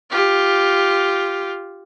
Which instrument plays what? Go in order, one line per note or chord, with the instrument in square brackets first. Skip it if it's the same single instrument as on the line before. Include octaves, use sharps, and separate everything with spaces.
[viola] F4 G4